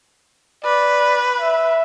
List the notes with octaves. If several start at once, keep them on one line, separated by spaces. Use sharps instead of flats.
B4 D5
E5